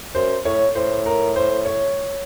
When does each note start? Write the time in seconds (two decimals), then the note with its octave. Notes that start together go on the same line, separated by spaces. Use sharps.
0.15 F#2 C5
0.45 A2 C#5
0.75 A2 C5
1.06 A#4
1.36 C5
1.65 C#5